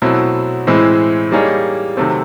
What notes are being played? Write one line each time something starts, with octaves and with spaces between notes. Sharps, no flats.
B2 F#3 A3 C4 E4
A2 E3 G#3 C4 E4
G3 A#3 D#4 G#4 C#5
C3 D#3 F#3 A3 C4